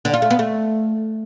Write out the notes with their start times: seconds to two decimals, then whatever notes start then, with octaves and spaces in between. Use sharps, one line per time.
0.05 D3
0.13 F4
0.22 A3
0.30 B3
0.39 A3